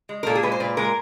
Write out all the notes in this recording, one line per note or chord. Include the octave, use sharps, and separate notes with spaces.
G#3
A#4
A#2 A4
G#4
G#3 B4
C5
A#2 B4
G#3 A#4